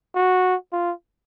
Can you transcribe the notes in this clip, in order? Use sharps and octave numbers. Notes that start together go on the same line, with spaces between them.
F#4
F4